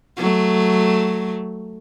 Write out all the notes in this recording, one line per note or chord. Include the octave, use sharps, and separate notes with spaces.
F#3 A3